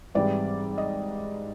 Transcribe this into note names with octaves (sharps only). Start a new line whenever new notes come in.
G#2 E3 G3 C4 D5
D#5